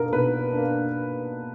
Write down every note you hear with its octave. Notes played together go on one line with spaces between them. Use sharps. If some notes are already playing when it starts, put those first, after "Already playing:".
Already playing: B2 A#3 D4 A#4
B2 B4
A#3 D4